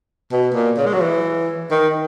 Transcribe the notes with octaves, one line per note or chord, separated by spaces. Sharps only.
B2
A#2
C#3
G#3
F#3
E3
D#3